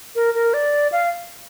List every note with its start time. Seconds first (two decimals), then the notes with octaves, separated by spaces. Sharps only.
0.15 A#4
0.34 A#4
0.54 D5
0.92 F5